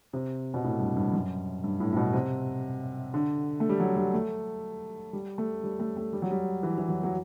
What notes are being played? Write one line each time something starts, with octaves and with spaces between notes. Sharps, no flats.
C3
B2
A2
G2
G2
F#2
G2
A2
A2
B2
C3
D3
A3
G3
F#3
G3
A3
G3
A3
G3
A3
A3
G3
F#3
G3
E3
E3
F#3
F#3